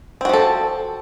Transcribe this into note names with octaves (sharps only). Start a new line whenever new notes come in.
F3 C4 F#4 A4